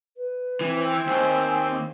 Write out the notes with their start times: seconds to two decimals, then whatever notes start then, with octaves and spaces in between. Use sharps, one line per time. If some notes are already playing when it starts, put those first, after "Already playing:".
0.16 B4
0.61 E3 C4
1.07 D#2 C5 G#5